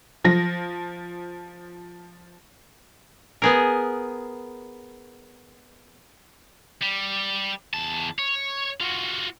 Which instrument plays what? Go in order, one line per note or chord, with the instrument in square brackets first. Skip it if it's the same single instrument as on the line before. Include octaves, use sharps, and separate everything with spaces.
[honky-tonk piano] F3 A#6
[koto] B3 G#4 A#4
[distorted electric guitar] G3
E2 A5
C#5
F4 F#4